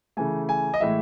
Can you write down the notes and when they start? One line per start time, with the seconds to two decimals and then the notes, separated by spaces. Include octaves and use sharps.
0.17 C#3 E3 A3 G#5
0.49 G#5
0.74 D#5
0.80 A2 E3 G#3 E5